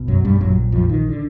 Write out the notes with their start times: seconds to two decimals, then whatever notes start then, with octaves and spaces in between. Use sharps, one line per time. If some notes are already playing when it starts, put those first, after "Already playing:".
Already playing: B1 B2
0.08 F#2 F#3
0.25 G2 G3
0.40 A#1 F#2 A#2 F#3
0.72 F2 F3
0.89 D#3
1.09 D3